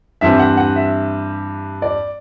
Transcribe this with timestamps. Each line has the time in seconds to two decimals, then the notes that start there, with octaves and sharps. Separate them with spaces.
0.21 G2 E3 G3 C4 E5
0.39 F#5
0.57 F#5
0.76 E5
1.82 D5